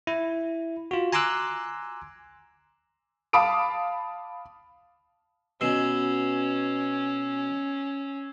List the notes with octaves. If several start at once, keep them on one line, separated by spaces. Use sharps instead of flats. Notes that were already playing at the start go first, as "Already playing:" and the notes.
E4
F4 F#4
G#5 A#5 C6 D6 E6 F#6
F5 A5 B5 D6 D#6 D7
B2 C#4 E6 C7 E7